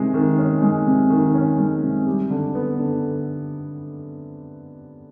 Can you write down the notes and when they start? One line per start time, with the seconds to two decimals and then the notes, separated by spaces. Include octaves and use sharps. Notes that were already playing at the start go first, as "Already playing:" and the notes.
Already playing: C3 D#3 G#3
0.14 D#3
0.38 C#4
0.62 G#3
0.86 C3
1.10 D#3
1.35 C#4
1.58 G#3
1.82 C3
2.07 G3
2.30 D3
2.55 B3
2.79 D3